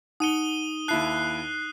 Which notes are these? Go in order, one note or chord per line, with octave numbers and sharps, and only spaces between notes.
D#4 F#5 D#6 C#7 D#7 G7
D#2 E4 A5 F#6 C7